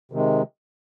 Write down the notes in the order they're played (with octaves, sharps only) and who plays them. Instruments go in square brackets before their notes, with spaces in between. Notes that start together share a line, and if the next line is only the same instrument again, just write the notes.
[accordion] C3 D#3 G#3